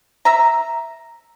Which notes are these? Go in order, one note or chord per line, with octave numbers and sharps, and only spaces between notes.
E5 A#5